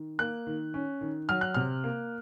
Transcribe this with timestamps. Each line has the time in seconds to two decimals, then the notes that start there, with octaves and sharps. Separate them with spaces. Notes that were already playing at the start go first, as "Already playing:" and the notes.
Already playing: D#3
0.19 A#3 F#6
0.47 D#3
0.74 C#4
1.01 D#3
1.29 F#3 F6
1.41 F#6
1.54 C3 F6
1.84 A#3